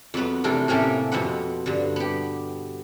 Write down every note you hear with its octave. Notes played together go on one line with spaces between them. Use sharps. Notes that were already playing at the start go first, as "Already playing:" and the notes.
F2 F#3 B3 B4
C3 E3 A3 D4 A4 A#4
A2 C3 A#3 C#4 G4 A4
F2 B2 C4 B4 F#5
G2 D3
B3 G4